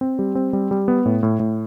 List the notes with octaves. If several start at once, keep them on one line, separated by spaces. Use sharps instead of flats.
C4
G3
C4
G3
G3
B3
A2
A2
A2